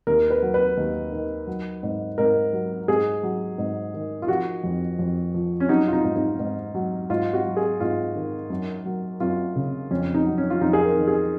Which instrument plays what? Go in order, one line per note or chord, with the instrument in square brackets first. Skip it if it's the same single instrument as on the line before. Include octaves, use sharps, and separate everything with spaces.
[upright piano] D#2 A#4
B4
F#3
B4
D#2
D#3
F#3
G#2
G#2 A#4
F#3
G#2 G#4
F#3
G#2
D#3
F4
F3 F#4
F2
F2
F3
C#4
F#3 D#4
F4
D#4
G#2
D#4
G#2
F#3
G#2 F4
F#4
F#3
G#4
G#2 F4
D#3
F#2
F#3
F#2 F4
C#3
F2 C#4
D#4
F#3
C#4
F4
F2 D#4
G#4
A#4
D#3
G#4